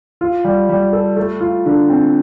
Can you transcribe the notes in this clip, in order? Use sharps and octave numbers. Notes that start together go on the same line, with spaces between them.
F4
G3
G3
A4
A3
F4
D3
C4